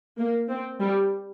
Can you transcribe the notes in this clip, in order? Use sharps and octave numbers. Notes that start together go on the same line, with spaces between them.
A#3
C4
G3